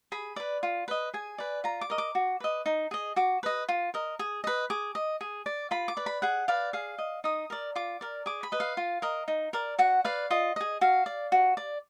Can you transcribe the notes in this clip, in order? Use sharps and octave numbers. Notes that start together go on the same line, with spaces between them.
G#4 B5
B4 D5
F4
B4 D#5
G#4 G#5
B4 D5
F4 A#5
D6
A#4 D#5
D6
F#4
B4 D#5
D#4
G#4 D#5
F#4 D6
B4 D#5
F4
A#4 D#5
G#4
B4 D#5
G#4 D6
D#5
G#4
D5
F4 B5
D6
B4 D5
B5
G#4 F#5
B4 D5 F5
G#4 F5
D#5
D#4 D#6
A#4 D5
F4 D6
A#4 D5
G#4 D6
B5
B4 D#5
F5
F4
A#4 D#5
D#4
A#4 D5
F#4 F#5
B4 D5 F5
F4 D#5
G#4 D#5
F#4 F5
D5
F#4
D5